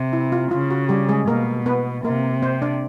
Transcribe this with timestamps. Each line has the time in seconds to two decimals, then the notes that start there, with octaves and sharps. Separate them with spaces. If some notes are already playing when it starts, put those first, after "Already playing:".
Already playing: C3
0.13 E4
0.32 F4
0.51 C#3 F4
0.71 F#4
0.89 G3 G4
1.09 G#3 G#4
1.28 B2 A#3 A#4
1.66 B3 B4
2.04 C3 A#3 A#4
2.42 C4 C5
2.62 D4 D5